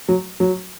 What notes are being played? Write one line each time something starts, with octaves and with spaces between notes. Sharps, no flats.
F#3
F#3